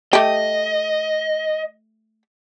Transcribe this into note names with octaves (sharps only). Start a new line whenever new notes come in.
A3 G4 D#5